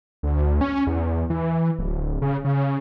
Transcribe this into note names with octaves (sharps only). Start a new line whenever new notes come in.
D2
C#4
E2
E3
D1
C#3
C#3